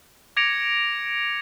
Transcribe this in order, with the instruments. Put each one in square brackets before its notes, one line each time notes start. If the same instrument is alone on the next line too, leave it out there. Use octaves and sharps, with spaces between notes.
[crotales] D6 G#6 A#6 C#7 D7 F7